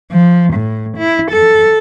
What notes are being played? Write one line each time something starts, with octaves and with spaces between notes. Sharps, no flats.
F3
A2
E4
A4